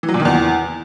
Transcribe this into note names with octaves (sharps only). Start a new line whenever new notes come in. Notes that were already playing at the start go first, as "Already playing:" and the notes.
E3
F#3
A#2
D#3
E2